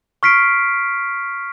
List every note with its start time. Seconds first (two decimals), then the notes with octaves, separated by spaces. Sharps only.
0.23 C#6 F6 B6 C7 D7